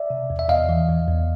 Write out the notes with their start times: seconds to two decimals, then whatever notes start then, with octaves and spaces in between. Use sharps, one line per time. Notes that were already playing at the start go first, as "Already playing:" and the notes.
Already playing: D5 E5
0.10 C3
0.30 E2
0.39 E5
0.49 E2 D#5 F5
0.69 E3
0.88 E2
1.08 E2